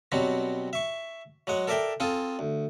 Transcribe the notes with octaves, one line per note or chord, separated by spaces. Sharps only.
B2 F#3 G3 C4 F#4
E5 C#6
F#3 G#3 F#5
A4 A#4 D5 E5 G5
C4 F4 G#4 A4
D2